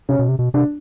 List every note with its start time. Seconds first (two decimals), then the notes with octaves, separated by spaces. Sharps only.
0.09 C3 C#4
0.19 B2
0.29 C3
0.39 B2
0.54 C3 D4